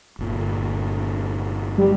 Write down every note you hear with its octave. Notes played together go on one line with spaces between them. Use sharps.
G1 A#2
G3